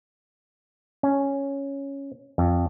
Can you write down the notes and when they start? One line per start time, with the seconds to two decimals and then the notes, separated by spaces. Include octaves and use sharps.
1.03 C#4
2.38 F2